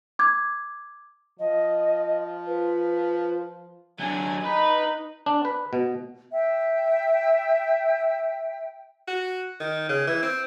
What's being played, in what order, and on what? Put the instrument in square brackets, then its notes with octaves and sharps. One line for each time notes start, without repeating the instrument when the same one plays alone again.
[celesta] D6 G#6
[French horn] F3 [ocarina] D#5
[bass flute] F4 [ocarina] B4
[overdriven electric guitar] F#3 D4 [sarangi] G#5
[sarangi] D#4 [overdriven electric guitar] B4
[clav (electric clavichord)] D4
B4
B2
[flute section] E5 G5
[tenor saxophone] F#4
D#3
C#3
E3
C4